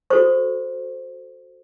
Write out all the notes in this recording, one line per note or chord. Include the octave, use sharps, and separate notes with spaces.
F#4 A4 C5 C#6